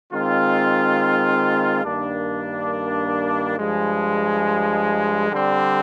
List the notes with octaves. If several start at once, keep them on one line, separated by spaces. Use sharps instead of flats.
D#3 G#3 C4 F4
G2 D#3 A#3 D4
G2 F3 G#3
D3 G3 C4